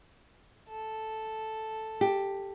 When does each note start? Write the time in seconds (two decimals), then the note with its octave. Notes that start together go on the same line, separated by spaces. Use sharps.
0.68 A4
2.01 G4